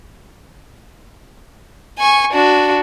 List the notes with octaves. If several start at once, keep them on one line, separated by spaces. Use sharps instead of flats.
G#5 C#6
D4 F#4